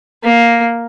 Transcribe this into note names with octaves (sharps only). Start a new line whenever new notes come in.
A#3